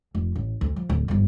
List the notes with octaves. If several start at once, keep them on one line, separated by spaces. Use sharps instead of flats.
F1
A1
D2
F3
D1
G1 F2